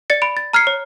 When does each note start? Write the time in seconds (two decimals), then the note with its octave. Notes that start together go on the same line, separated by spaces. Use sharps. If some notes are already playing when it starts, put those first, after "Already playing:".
0.10 D5 A6 C#7
0.22 B5 D7
0.37 A6
0.53 A#5 F6 G#6 C7 C#7
0.67 C#5